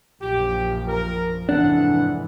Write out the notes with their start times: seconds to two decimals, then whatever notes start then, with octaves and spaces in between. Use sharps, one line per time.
0.22 A#1 F#2 F3 G4
0.88 A#4
1.49 F1 G#2 E3 D4 A4 F#5